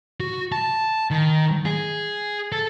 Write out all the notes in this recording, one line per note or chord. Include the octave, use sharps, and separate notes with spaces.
F#4
A5
D#3
G#4
A4